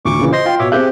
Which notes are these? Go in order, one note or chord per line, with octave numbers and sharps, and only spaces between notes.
D2 C#6 D6
A#2 C#3 E3
C5 D#5 C6 A#6
F4 F5 G5
B2 C#5 E5 D6
C4 G4 G#4 E5 F#6 G6